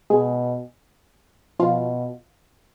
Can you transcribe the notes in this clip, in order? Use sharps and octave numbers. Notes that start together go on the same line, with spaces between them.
B2 G#3 G#4
B2 F3 F4